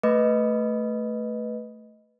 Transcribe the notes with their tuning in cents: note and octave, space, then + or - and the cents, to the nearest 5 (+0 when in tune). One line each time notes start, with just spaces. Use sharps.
A3 +10 B4 +0 D#5 +5